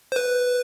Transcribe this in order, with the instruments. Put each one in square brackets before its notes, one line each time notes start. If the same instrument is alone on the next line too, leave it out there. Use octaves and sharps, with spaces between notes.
[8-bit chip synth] C5
B4